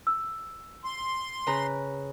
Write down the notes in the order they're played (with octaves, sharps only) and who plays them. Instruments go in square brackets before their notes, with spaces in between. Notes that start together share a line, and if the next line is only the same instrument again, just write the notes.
[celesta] E6
[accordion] C6
[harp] C#3 B4 A#5